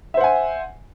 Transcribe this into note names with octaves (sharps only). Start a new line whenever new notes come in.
C5 E5 F#5 G#5